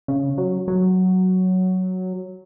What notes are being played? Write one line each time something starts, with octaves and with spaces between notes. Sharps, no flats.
C#3
F#3
F#3